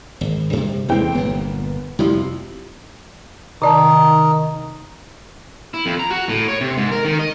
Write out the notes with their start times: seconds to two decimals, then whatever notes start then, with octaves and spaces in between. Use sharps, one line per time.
0.21 G#1
0.53 G2 C3
0.89 D#1 E3 G#3 C4 G5
1.15 G1 A#2 B3
1.99 F2 C3 F3 G3 E4
3.62 C3 D#3 D#4 D5 A5
5.74 E4
5.86 F2
5.99 A#5
6.11 F#4
6.29 A2
6.48 C#5
6.61 C3
6.78 G#2
6.92 A#4
7.05 D#3
7.19 D#5